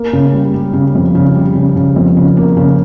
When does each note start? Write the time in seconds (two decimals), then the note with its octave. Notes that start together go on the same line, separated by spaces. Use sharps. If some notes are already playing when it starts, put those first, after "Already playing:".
Already playing: A#3
0.13 C#3
0.33 G3
0.54 G3
0.73 C#3
0.95 F2
1.15 C#3
1.35 G3
1.56 C#3
1.76 C#3
1.96 F2
2.17 C#3
2.37 A#3
2.57 C#3